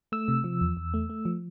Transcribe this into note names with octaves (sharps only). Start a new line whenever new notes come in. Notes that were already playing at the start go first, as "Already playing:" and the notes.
A3 E6
C3
F3
E2
E2
A3
A3
F3